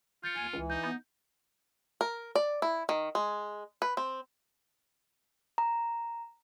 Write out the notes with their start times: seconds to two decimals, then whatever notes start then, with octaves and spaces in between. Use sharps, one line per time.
0.24 F4 G6 A6 C#7
0.36 D#2 G#5 C#7 D#7
0.53 C#2 E3
0.70 D#4 G6
0.83 B3
2.01 A#4
2.35 D5
2.62 E4
2.89 D#3
3.15 G#3
3.82 B4
3.97 C4
5.58 A#5